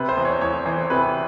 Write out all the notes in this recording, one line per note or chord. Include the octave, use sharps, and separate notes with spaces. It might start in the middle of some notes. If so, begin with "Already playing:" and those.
Already playing: C3 B4
C5
E2
C#5
E2 C#5
E3 C5
C3 B4